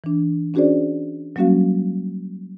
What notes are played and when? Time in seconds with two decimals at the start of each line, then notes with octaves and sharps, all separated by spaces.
0.04 E3 D4
0.54 C#4 D4 F#4 G#4 C5 D5
1.36 F#3 G3 A#3 C#4 F#4 F5